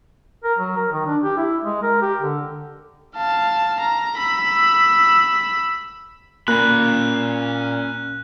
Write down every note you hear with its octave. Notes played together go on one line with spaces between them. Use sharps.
A#4
F#3
A#4
D#3
D4
G4
E4
G#3
A#4
G4
D3
F5 A5
A#5
B5 E6
A#2 A#3 C#4 B5 F#6